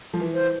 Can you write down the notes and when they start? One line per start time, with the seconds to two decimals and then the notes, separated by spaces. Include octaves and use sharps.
0.14 F3
0.20 E3
0.34 C5